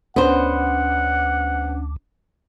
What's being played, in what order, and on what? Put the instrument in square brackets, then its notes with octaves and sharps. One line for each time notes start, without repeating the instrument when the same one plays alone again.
[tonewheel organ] D2 [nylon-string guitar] B3 C5 [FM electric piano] C#4 D4 [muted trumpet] F#5